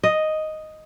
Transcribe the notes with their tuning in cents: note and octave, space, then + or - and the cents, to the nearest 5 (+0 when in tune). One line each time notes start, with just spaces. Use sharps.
D#5 +0